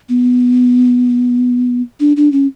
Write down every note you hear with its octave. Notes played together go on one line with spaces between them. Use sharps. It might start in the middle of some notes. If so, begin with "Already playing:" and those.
B3
D4
D4
C#4